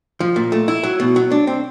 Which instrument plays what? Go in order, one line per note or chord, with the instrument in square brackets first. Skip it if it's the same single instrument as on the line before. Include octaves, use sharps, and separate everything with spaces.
[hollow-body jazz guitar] F3
A#2
A3
E4
F#3
B2
F#3
D4
C4